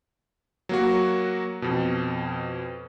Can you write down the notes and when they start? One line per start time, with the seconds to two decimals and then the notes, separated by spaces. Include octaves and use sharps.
0.69 F#3 A#3 F#4
1.62 F2 B2